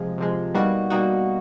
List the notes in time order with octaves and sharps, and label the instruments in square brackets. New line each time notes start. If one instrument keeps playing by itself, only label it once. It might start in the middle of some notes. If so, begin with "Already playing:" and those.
Already playing: [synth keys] C3 F3 G#3
C3 F3 G#3
B2 G3 A#3 D#4 F#4
B2 G3 A#3 D#4 F#4